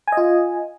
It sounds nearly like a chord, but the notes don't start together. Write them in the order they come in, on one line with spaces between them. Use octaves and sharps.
G#5 D#5 F4